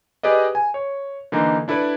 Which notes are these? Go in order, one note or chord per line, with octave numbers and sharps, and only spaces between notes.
G4 G#4 B4 D5 D#5
G#5
C#5
D3 E3 A#3 D#4
D4 E4 A4 B4 D5